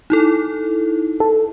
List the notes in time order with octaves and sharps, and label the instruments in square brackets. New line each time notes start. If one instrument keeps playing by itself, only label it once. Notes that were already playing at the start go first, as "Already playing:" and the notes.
[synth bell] D#4 E4 A4
[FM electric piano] A4